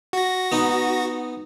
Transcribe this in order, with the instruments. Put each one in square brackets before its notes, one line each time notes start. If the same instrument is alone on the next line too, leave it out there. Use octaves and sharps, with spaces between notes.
[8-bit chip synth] F#4 A#6
[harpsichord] B3 D#4